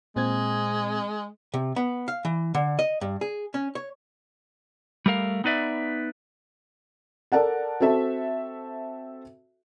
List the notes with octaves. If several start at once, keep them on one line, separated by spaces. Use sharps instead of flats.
A#2 G#3 C4 G#6
C3
B3
F5
E3
D3
D#5
G2
G#4
C#4
C#5
G3 A3 A#4 F5
B3 D#4 B4 D5 E5
A4 A#4 D5 F#5 A5
C4 F#4 A4 E5